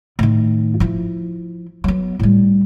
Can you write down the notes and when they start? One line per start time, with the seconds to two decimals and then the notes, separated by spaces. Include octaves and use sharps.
0.19 A2 D#3
0.80 F3 E4
1.84 F#3 B3
2.19 A2 G3